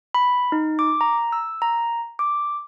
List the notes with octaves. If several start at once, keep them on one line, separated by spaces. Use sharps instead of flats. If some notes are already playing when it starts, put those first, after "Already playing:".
B5
D#4
D6
A#5
E6
A#5
D6